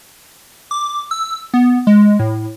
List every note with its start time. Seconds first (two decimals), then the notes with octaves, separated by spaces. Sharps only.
0.71 D6
1.11 E6
1.54 B3
1.87 G#3
2.19 A2